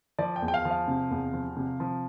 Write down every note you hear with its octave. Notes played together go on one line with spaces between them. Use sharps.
F3 D5
G5
E2
G5
F5
F3
F5
C3
E2
F3
C3
F3